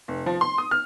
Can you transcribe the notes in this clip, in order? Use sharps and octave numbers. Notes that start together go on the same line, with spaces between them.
F1
F3
C6
D#6
F6